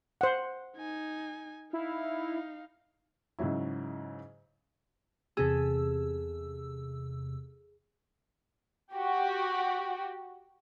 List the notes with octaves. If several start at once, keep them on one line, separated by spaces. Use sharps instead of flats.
C5 F#5
D#4 G#5
D#4 E4 F5
G#2 C#3 F#3 E4
E2 C3 G#4 A4 E6
F#4 G4